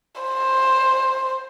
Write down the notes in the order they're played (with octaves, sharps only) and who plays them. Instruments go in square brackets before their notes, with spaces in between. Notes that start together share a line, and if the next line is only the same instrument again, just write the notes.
[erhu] C5